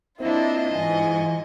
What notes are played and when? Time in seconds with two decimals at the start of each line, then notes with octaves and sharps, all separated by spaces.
0.20 A#3 C4 D4 E4 F4 D#5
0.75 G#2 E3 G#5